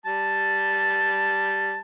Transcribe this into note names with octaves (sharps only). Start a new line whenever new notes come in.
G3 A5